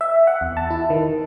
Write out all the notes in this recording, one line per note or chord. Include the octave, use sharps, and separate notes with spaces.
E5
F#5
E2
A5
E4
D#3